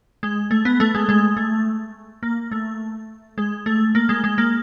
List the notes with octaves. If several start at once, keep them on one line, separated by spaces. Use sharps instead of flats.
G#3
A3
B3
A3
G#3
G#3
A3
A#3
A3
G#3
A3
A#3
G#3
G#3
A#3